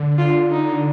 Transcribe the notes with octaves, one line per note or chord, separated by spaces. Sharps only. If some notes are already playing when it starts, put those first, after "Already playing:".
Already playing: D3
F4
D#4